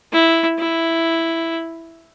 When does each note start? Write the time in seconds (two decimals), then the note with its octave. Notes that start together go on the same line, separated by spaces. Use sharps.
0.13 E4
0.59 E4